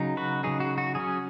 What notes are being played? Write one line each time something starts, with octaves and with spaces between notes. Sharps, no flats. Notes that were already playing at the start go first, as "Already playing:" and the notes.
Already playing: C#3 F#3 D#4
F#4 B4
C#3 F#3 D#4 G#4
F#4
F#4
F#3 C#4 G#4